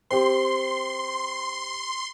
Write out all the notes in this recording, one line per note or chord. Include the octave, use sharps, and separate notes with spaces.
C4 G4 C6